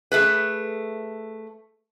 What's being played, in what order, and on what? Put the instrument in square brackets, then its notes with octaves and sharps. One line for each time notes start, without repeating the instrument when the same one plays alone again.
[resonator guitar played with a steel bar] A3 G#4 B4